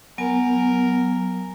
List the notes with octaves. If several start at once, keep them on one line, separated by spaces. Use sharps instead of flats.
F#3 B3 A#4 G#5